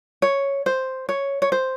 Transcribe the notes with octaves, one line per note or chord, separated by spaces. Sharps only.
C#5
C5
C#5
C#5
C5